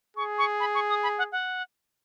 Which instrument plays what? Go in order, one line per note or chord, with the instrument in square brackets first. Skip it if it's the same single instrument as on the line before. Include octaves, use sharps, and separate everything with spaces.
[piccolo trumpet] G#4 [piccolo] C#6
[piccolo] C#6
B5
C#6
D#6
B5
F#5
F#5